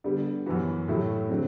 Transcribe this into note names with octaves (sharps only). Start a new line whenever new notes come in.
D3 G3 B3
F#2 E3 B3 F#4
A2 F#3 A3 E4 G4
D3 F#3 C4